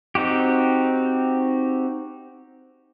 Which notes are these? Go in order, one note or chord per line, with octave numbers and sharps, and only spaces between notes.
C4 D#4 F#4 G4